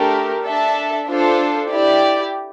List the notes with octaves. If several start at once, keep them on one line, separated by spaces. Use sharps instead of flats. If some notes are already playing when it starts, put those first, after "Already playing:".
Already playing: A3 D4 G4 A#4
D4 A4 E5 A5
D4 F4 A4 C5
E4 G4 D5